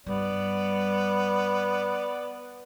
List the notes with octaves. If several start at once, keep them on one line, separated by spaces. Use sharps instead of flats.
G2 G3 B3 D5